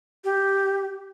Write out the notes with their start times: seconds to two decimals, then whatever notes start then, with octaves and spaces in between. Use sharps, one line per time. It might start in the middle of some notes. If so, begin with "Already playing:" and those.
0.24 G4